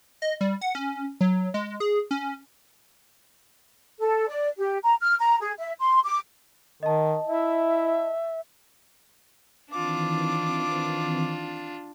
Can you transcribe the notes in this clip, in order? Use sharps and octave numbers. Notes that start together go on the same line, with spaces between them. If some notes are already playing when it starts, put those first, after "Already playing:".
D#5
G3
F#5
C#4
F#3
G#3
G#4
C#4
A4
D5
G4
A#5
F6
A#5
G#4
E5
C6
D6
D#3 D#5 A5
E4 E5
D#3 E3 C4 D4 F4 D6